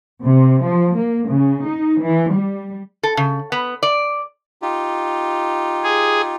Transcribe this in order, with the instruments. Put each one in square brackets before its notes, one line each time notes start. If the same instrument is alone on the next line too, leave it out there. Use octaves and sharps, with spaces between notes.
[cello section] C3
F3
A#3
C#3
D#4
E3
G3
[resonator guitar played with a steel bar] A4
C#3
B3
D5
[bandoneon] D#4 F4 G4
[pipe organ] G#4